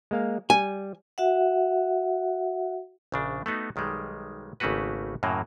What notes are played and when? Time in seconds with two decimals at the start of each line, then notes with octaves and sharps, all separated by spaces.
0.11 G#3 A#3 F5
0.50 G3 G#5
1.18 F#4 E5 F#5
3.12 A#1 C#3 D4
3.46 A3 B3 D#4 F#4
3.76 B1 D#3 G3 G#3
4.60 G#1 C#3 A3 A#3 F#4 B4
5.23 F#2 A2 C#3 F#3 A#3